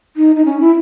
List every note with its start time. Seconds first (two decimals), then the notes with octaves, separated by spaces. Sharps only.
0.16 D#4
0.35 D#4
0.45 C#4
0.61 E4